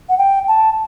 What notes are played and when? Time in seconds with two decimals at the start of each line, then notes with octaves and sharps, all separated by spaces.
0.09 F#5
0.18 G5
0.48 A5